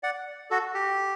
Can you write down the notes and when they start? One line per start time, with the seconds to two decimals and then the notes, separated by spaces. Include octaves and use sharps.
0.03 D5 F#5
0.50 F#4 A4
0.74 G4